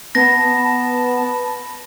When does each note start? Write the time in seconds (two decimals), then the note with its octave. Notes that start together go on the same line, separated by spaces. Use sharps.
0.15 B3 A5 B5 A#6